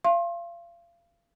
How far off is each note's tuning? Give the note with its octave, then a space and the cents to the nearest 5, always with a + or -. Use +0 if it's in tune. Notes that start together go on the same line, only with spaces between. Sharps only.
F5 -30 C6 +35